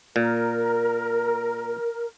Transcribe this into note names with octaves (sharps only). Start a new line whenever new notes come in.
A#2 A#4